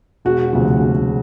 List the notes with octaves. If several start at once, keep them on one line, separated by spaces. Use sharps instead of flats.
E1 F#4
D2 C3 F3
E1